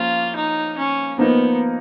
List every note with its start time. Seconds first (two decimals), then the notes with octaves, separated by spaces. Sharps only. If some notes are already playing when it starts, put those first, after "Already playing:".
Already playing: F3 A#3 C#4 F4
0.36 D#4
0.78 C#4
1.18 F3 A#3 B3 D#4 A#4